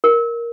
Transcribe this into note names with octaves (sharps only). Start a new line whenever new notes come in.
A#4